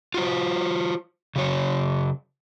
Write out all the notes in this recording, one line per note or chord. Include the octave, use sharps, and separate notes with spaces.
F4 F#4 C5
C#3 F#3 C#5